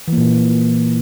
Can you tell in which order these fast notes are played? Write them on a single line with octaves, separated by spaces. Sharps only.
E3 A#3 A#2